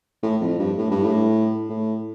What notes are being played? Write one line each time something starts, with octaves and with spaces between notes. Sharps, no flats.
A2
F2
G2
A2
G2
A2
A2